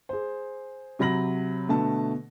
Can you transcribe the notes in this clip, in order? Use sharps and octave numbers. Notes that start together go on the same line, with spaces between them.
G#4 C5
C3 F#3 B5 A#6 F#7
B2 D3 A3 A5